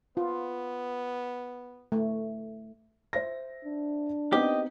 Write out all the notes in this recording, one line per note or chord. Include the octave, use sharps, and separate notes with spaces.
B3 F4
A3
C5 E5 A#6
D4
B3 C4 D#4 G4 D#5